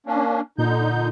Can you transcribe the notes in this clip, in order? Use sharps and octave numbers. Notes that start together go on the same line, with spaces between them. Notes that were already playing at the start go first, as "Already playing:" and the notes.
A#3 C#4 D4
A#2 D3 D#4 G6